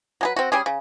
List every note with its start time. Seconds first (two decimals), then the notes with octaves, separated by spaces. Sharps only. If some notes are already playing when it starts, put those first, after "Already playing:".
0.21 F#3 G#4 B4
0.36 C4 F#4
0.52 G3 C#4 G#4
0.66 C#3